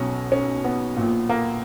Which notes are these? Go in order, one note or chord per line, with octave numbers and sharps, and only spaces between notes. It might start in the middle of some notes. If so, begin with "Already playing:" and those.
Already playing: B1 B2 C#4
C#4
B3
A#1 A#2
A#3